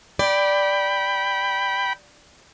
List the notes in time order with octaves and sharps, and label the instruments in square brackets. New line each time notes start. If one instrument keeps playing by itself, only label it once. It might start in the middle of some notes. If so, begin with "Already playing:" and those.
[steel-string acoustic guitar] D5 [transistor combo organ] G5 B5